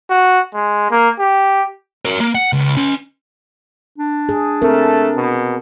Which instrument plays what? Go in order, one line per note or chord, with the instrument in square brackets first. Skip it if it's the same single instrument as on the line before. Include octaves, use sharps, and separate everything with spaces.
[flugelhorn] F#4
G#3
A#3
G4
[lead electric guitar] F#4 A#4
A#3
F#5
C#2
C#4 C6
[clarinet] D4
[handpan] G#4
[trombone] A3 [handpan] C4 A#4
[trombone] B2